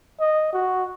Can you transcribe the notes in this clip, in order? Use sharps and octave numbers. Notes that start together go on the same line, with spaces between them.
D#5
F#4